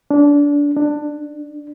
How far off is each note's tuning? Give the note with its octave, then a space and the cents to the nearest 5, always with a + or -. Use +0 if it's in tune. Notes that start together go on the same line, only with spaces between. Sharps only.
D4 -25
D4 +15